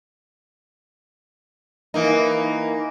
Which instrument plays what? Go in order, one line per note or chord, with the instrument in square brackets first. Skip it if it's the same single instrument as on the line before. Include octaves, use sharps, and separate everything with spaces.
[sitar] E3 A#3 D#4